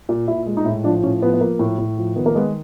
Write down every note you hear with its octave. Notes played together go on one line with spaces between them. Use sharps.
A#2
A#2 E4
G#3
D#4
A2 E4
F3 D4
A2 C#4
F3 B3
B3
F3 A#3
A2
A2
F3
D#3 B3
A#3
G#3 B3